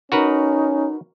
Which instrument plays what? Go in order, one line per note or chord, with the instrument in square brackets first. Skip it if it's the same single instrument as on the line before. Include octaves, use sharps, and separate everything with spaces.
[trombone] C#4 [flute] D#4 [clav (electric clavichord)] F#4 A#4 B4